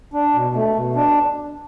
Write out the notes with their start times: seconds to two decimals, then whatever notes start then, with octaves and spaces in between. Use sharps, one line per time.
0.13 D4
0.34 B2
0.54 A3
0.75 B2
0.96 D4